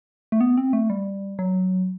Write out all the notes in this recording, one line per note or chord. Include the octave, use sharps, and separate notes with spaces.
A3
B3
C4
A3
G3
F#3